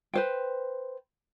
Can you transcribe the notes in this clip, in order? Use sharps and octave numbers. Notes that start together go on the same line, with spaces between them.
B4 C5 G5